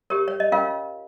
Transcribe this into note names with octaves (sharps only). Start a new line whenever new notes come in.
G4 A#4 C#5
C#5
D#5
C#4 F4 A#4 C#5 F5